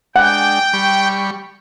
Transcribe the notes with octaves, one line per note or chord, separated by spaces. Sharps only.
G#3 D4 F#5 G5
G3 B5 C#6